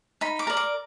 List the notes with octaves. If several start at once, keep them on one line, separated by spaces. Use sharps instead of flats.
D#4 B5
D6
A#4 D5
D6